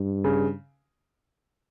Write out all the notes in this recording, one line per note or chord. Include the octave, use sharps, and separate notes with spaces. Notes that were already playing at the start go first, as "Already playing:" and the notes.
Already playing: G2
C#3